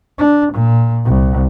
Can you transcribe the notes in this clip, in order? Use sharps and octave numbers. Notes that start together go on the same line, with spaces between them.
D4
A#2
C2